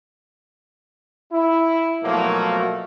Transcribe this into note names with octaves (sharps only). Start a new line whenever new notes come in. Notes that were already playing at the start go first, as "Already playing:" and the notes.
E4
B2 F3 F#3 A3 A#3